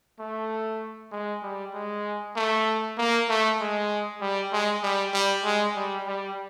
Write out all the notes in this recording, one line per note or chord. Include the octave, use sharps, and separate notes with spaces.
A3
G#3
G3
G#3
A3
A#3
A3
G#3
G3
G#3
G3
G3
G#3
G3
G3